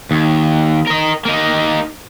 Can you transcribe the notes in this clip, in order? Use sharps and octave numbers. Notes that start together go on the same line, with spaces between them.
D#2
A#4 D#5
A#3 D#4